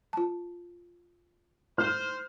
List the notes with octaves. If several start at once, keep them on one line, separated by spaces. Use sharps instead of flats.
F4 A5
C5 F6